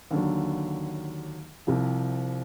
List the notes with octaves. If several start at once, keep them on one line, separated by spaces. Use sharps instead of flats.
D#2 D3 F#3
C2 C3 F3